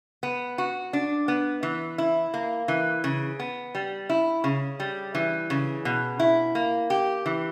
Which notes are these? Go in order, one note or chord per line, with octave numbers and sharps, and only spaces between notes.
B3
F#4
D4
B3
E3
E4
A#3
E3
C#3
B3
G3
E4
C#3
G3
E3
C#3
B2
E4
A#3
G4
E3